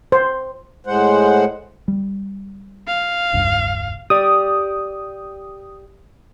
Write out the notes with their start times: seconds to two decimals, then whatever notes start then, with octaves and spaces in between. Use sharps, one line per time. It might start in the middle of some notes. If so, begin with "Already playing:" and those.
0.12 C5
0.86 A2 G#3 C5 F#5
1.88 G3
2.87 F5
3.33 E1 C#2 G2
4.10 G4 D5 D#6